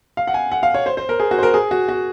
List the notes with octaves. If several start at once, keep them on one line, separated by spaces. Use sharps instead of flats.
F5
F#5
G#5
F#5
F5
C#5
C5
C5
A#4
G#4
F#4
C5
A#4
G#4
F#4
F#4